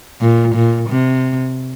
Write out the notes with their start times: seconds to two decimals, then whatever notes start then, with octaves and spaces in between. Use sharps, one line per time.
0.21 A#2
0.55 A#2
0.89 C3